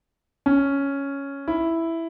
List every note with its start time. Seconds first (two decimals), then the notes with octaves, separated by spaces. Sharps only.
0.46 C#4
1.48 E4